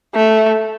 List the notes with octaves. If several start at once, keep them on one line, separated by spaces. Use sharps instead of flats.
A3